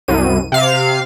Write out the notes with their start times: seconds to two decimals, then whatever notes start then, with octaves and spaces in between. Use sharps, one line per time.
0.08 C2 F#2 D#7
0.52 C3 F5